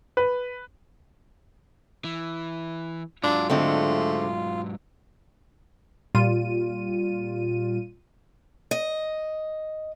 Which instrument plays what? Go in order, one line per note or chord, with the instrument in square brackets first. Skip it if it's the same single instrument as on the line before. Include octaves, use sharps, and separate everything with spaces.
[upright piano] B4
[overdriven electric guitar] E3
[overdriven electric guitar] G#2 F#3 [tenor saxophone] D4 [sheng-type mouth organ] F4
[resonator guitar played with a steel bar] D3 G#3 C4 [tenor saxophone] A3
[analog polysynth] A#2 G3 F4 D#7
[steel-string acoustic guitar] D#5